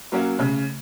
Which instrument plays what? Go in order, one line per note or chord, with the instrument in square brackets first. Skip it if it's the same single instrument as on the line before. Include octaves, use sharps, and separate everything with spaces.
[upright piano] F#3 A#3 C#4 F#4
[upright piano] C#3 [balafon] A3